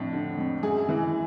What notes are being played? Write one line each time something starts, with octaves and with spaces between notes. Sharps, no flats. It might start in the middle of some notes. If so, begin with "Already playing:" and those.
Already playing: F2 A2 F3 D4
D3
F2
F#2 G#4
E3